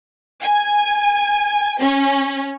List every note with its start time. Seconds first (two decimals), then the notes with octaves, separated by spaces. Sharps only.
0.42 G#5
1.79 C#4